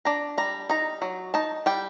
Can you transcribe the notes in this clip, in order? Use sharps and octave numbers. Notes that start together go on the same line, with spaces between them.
D4 A#5
G3 A#5
D#4 A#5
F#3
D#4 A5
G3 G5